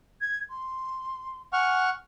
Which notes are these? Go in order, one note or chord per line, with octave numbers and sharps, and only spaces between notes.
G#6
C6
F#5 G#5 C#6 F6